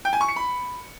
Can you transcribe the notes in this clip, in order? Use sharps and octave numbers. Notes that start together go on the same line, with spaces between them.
G5
G#5
C#6
C#7
B5